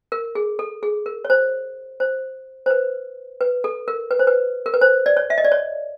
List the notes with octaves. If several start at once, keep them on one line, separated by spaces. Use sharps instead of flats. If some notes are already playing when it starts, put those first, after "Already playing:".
A#4
G#4
A4
G#4
A#4
C#5
C5
C5
C5
B4
B4
A4
A#4
B4
C5
B4
A#4
B4
C5
D5
C#5
E5
D#5
D5
C#5